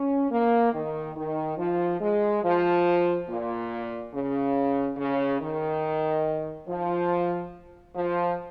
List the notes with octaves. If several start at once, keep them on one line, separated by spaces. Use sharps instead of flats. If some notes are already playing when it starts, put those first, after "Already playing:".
Already playing: C#4
A#3
D#3
D#3
F3
G#3
F3
A#2
C#3
C#3
D#3
F3
F3